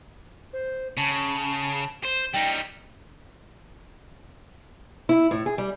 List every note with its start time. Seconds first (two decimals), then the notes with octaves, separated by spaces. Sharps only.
0.53 C5
0.97 C#3 A5
2.04 C5
2.34 G3 D#4 G5
5.09 E4
5.31 A2
5.46 G#4
5.58 G3